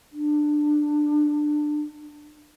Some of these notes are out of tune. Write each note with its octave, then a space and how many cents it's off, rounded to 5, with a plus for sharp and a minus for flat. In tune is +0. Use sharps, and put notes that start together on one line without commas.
D4 +20